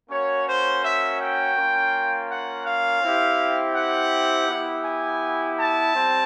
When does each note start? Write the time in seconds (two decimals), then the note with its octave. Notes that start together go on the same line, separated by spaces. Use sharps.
0.10 A#3 C#4 F#4 C#5
0.46 C5
0.83 E5
1.19 G5
1.56 A#3 C#4 F4
2.30 F#5
2.65 F5
3.03 C4 E4 G4
3.74 F#5
4.48 B3 E4 G4
4.84 G#5
5.58 A5
5.95 G3 C4